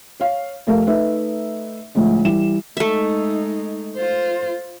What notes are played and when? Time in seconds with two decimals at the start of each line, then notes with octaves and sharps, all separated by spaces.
0.20 C#5 F5
0.67 F1 A3 A#4 F5
0.87 A3 D#4 B4 E5
1.95 D2 A2 F3 G#3
2.25 E3 G3 E7
2.77 G#3 A3 D#4 E5
3.96 F4 C5